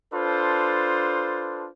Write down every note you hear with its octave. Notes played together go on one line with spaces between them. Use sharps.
D4 F4 A4 B4 C5